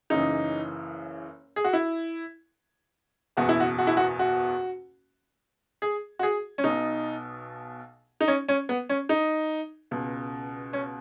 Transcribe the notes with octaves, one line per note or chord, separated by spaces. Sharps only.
F#1 F#2 C#3 E3 D#4
G#4
F#4
E4
F#1 E2 B2 F#4
E4
F#4
F#4
E4
F#4
F#4
G#4
F#4
G#4
C#4
B1 B2 D#4
D#4
C#4
C#4
B3
C#4
D#4
C#2 B2
C#4